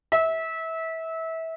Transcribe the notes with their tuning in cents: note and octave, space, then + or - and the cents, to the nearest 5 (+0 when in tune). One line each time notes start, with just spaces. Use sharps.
E5 -25